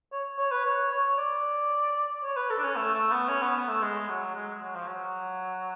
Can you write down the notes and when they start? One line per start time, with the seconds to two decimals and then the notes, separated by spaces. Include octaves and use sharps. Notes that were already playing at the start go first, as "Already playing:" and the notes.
0.12 C#5
0.38 C#5
0.52 B4
0.65 C#5
0.91 C#5
1.18 D5
2.24 C#5
2.37 B4
2.50 A4
2.58 D4
2.63 C#4
2.77 A3
2.94 A3
3.12 B3
3.29 C#4
3.42 B3
3.56 B3
3.69 A3
3.82 G#3
4.09 F#3
4.35 G#3
4.48 G#3
4.62 F#3
4.75 F3
4.87 F#3